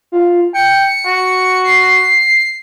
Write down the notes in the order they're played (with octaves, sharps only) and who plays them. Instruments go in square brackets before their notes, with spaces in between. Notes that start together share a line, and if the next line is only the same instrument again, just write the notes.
[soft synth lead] F4
[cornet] G5 [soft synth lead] C#7
[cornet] F#4
[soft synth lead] C7